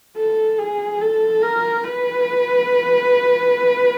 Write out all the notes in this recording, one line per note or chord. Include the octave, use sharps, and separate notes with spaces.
A4
G#4
A4
A#4
B4